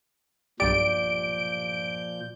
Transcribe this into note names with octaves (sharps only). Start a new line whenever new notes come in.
B1 G2 A#2 F3 G4 D5 G6 D7